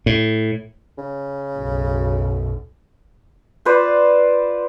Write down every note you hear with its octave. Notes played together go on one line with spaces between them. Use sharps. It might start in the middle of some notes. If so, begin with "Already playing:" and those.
A2
C#3
B1 F#2
F4 B4 C5 D5